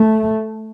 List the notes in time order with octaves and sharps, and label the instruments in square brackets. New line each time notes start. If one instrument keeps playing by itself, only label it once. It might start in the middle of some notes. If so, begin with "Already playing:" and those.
Already playing: [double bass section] A3